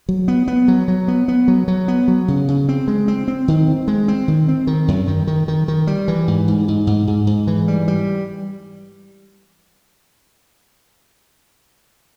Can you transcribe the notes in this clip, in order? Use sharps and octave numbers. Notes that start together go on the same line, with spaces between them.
F#3
B3
B3
F#3
F#3
B3
B3
F#3
F#3
B3
F#3
C#3
C#3
C4
G#3
C4
C4
D#3
C4
G#3
C4
D#3
C4
D#3
F#2
D#3
D#3
D#3
D#3
G3
E3
G#2
G#2
G#2
G#2
G#2
G#2
E3
G3
G3